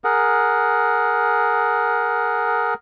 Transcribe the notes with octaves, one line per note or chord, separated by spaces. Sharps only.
G#4 A#4 F#5